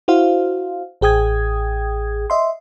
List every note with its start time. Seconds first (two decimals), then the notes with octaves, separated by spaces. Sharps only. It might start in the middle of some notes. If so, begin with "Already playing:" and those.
0.08 E4 F#4 C5 F5
1.01 A1 G#4 G5 D#6 G#6
2.30 D#5 E5 C6